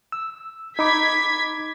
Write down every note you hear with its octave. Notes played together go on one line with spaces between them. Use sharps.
E6
D#4 B5 D6 G#6 B6